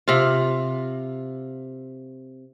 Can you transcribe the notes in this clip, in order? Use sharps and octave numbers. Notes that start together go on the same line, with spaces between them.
C3 F4